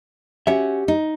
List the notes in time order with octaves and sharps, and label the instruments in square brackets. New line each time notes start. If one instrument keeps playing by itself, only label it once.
[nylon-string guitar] C#4 F#4 [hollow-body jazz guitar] G4 E5
[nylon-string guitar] D#4